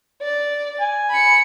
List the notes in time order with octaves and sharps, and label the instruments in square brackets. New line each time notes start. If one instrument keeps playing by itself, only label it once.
[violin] D5
[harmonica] G#5
[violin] B5 C#7